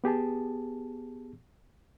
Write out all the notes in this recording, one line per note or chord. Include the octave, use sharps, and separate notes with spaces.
B3 G4 G#4 A5